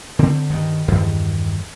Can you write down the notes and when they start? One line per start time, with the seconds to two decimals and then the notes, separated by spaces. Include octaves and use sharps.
0.19 D3 C4
0.50 G2 D#3
0.88 E2 G2 D#3